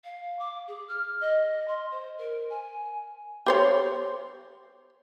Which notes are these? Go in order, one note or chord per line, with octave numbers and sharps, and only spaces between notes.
F5
D6
G#4
F6
D#5
C6
C5
A#4
G#5
G4 C5 C#5